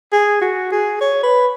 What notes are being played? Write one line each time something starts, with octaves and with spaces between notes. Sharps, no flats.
G#4
F#4
G#4
C#5
B4